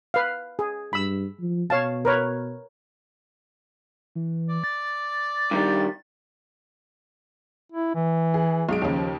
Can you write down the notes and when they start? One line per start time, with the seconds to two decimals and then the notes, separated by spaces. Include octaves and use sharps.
0.14 B4 F5
0.59 G#4
0.93 G2 B5 E6
1.40 F3
1.70 B2 C#5 F5 A5
2.05 A#4 B4 C#5
4.15 E3
4.49 D5
4.64 A6
5.51 G2 D#3 G3
7.72 E4
7.95 E3
8.34 G#4
8.69 B1 G#3 D7
8.82 D#2 C#3 F3